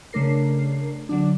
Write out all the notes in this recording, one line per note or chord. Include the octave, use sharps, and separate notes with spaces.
C#3 A3 D4 A#4 C7
D3 F#3 D4